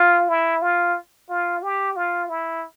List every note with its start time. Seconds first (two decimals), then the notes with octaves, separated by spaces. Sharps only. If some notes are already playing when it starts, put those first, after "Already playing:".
Already playing: F4
0.29 E4
0.62 F4
1.29 F4
1.63 G4
1.96 F4
2.29 E4